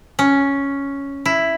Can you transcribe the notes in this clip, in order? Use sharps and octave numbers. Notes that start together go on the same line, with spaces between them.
C#4
E4